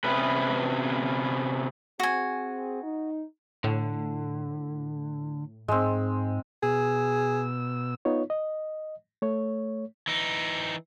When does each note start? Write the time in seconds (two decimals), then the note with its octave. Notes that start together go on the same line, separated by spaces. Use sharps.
0.04 C3 B3 C#4 B4
2.00 C4 F#4 G#4 G#5
2.83 D#4
3.64 A2 D3
5.68 G#2 G#3 C4
6.63 B2 G#4 E6
8.05 B3 D#4 F4 C#5
8.30 D#5
9.22 A3 C#5
10.07 E3 D#4